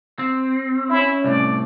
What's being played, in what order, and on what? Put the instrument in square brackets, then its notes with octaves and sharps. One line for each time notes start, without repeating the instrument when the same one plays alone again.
[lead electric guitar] C4
[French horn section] C#4 [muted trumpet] E4
[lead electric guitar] C2 A2 [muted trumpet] D5